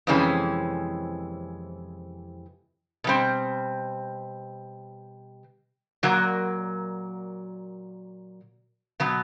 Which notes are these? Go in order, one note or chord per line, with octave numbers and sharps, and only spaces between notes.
F2 C3 E3 G#3 C#4
B2 G3 C4
A#2 F#3 A#3
B2 F#3 B3